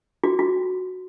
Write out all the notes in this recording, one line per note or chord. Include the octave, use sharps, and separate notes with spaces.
F#4
F#4